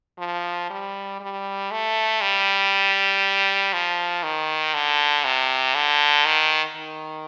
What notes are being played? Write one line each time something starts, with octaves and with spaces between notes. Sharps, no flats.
F3
G3
G3
A3
G3
F3
D#3
D3
C3
D3
D#3
D#3